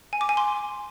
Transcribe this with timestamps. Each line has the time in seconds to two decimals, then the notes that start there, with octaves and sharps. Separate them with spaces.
0.13 G#5
0.21 D6
0.29 G#5
0.37 C6